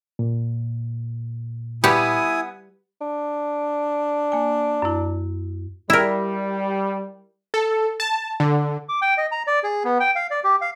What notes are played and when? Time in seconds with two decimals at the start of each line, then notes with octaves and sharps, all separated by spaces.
0.19 A#2
1.84 G3 B3 E4 G4 G#5 D#6
3.01 D4
4.32 A#3 G#5
4.82 F#2 E4
5.90 G3 E4 A#4
7.54 A4
8.00 A5
8.40 D3
8.89 D6
9.02 G5
9.18 D#5
9.31 A#5
9.47 D5
9.63 G#4
9.84 B3
10.00 G5
10.16 F5
10.31 D5
10.44 G4
10.61 F5